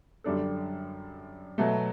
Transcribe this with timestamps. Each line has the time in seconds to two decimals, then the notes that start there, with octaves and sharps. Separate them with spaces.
0.24 F#2 D3 G3 D4 A4
1.58 B2 F#3 A3